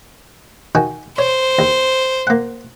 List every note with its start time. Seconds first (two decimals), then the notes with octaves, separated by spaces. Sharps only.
0.75 D#3 F#4 G#5
1.18 C5 C#5
1.59 D#2
2.27 A#3 F#5